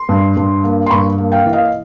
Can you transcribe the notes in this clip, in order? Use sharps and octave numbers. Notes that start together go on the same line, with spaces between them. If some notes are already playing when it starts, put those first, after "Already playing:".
Already playing: C6
G2
G2
A#3
C6
G2 B5 C#6
A#3
F5 G5
E3
D#5 F5